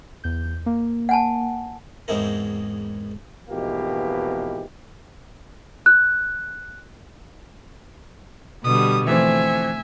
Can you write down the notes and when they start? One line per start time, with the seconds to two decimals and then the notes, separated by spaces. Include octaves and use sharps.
0.24 E2 G6
0.66 A#3
1.09 F#5 G#5 A5
2.08 E2 G#2 G#3 C4 E4 A#4
3.50 F2 G#2 B2 E3 A#3 G4
5.86 F#6
8.64 B2 D3 G3 D#6
9.07 E3 F3 A3 C4 E5 G#5